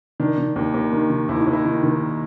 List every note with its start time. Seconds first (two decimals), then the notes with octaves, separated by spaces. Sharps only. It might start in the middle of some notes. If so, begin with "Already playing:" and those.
0.20 D#3 D4
0.38 D#3
0.56 D#2
0.74 D#2
0.92 D#3
1.10 D#3
1.29 D#2 E4
1.41 D#4
1.47 D#2
1.53 E4
1.65 D#3
1.83 D#3